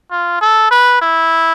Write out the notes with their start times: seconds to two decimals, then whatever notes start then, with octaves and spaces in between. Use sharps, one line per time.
0.11 F4
0.41 A4
0.71 B4
1.02 E4